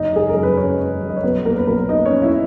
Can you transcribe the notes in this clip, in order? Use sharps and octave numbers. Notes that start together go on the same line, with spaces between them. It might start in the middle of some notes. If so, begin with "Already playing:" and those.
Already playing: F#1 D#4 D#5
G#3 G#4
A#4
F#2
B4
G#3 C#4 C#5
G#3
F#2
D#5
C#5
B1 B3 B4
A#2 A#3 A#4
B4
B1 A#3 A#4
A#2 D#4 D#5
C#4 C#5
B1
E4 E5